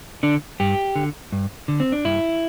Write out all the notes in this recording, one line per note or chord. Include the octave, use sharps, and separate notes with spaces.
D3 D4
G2 G4
D3
G2
D3
C4
D4
G2 E4